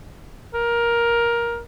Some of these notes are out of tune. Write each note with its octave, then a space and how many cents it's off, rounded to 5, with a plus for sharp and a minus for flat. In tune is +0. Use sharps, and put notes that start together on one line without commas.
A#4 +15